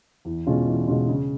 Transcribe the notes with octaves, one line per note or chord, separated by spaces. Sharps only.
E2
B2 G#3 C#4 F4
E2
B2 G#3 C#4 F4
C#3